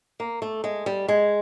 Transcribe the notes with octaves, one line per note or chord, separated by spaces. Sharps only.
A#3
A3
G#3
G3
G#3